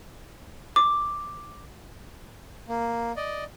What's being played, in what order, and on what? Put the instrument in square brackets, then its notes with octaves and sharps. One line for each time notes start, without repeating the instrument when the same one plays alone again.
[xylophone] D6
[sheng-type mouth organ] A#3
D5 D#5